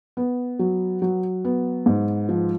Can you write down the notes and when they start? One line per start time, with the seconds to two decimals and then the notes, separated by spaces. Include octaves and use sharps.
0.17 B3
0.59 F#3
1.02 F#3
1.45 B3
1.86 G#2
2.29 F3